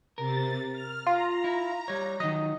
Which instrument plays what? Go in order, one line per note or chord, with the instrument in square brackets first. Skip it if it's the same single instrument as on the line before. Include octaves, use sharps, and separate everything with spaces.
[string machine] C3 A6 [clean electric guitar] A#4
[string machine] F6
[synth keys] F4 [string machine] A#5
[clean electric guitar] E4
G3 C#5
[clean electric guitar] D#3 F#3 [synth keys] D#5